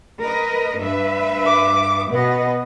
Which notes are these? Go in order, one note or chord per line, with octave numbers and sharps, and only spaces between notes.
A#4 B4 D#5
G2 B4 E5
D6
B2 B3 D#5